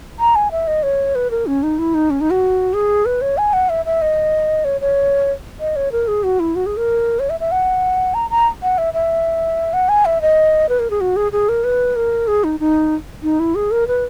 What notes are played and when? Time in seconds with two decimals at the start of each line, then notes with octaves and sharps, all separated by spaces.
0.19 A#5
0.35 G#5
0.51 E5
0.67 D#5
0.83 C#5
1.15 B4
1.31 A#4
1.47 C#4
1.63 D#4
1.79 E4
1.94 D#4
2.10 C#4
2.21 D#4
2.31 F#4
2.74 G#4
3.05 B4
3.22 C#5
3.38 G#5
3.53 F#5
3.69 E5
3.85 E5
4.02 D#5
4.65 C#5
4.81 C#5
5.60 D#5
5.76 C#5
5.92 A#4
6.08 G#4
6.23 F#4
6.40 E4
6.55 F#4
6.66 G#4
6.77 A#4
7.19 C#5
7.30 E5
7.40 E5
7.52 F#5
8.14 A#5
8.30 A#5
8.62 F#5
8.78 E5
8.94 E5
9.73 F#5
9.89 G#5
10.05 E5
10.21 D#5
10.69 B4
10.79 A#4
10.90 G#4
11.01 F#4
11.16 G#4
11.32 G#4
11.49 A#4
11.64 B4
11.96 A#4
12.27 G#4
12.44 D#4
12.60 D#4
13.23 D#4
13.40 E4
13.55 G#4
13.71 A#4
13.88 B4